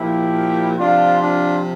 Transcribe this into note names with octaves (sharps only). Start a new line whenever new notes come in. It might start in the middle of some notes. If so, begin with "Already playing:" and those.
Already playing: A#2 F3 E4 G4
C3 F3 D4 F4
D4 F4